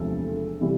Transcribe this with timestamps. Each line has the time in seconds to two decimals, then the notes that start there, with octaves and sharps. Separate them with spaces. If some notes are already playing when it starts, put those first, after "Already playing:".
Already playing: E1 D2 C3 F3 A3 A4
0.61 C3 E3 G3